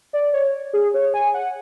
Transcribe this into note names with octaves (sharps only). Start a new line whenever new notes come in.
D5
C#5
G#4
C#5
G#5
F#5